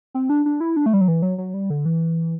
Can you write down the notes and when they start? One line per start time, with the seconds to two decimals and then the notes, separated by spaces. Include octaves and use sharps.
0.14 C4
0.30 D4
0.46 D4
0.60 E4
0.76 D4
0.86 A3
0.93 G3
1.01 F#3
1.08 E3
1.22 F#3
1.38 F#3
1.54 G3
1.70 D3
1.85 E3